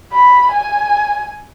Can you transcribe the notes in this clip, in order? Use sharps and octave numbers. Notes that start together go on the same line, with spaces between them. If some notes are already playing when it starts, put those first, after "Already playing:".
B5
G#5